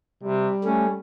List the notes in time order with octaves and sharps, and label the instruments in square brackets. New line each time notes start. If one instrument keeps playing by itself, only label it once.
[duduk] C3 [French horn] G3
[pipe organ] A3 [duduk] C#4